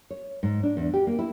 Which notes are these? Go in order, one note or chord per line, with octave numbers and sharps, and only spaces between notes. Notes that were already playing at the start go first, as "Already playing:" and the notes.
C#5
G#2
D4
E2
G4
A#3
E4